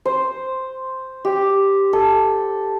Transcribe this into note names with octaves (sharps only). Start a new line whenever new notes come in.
C5
G4
A4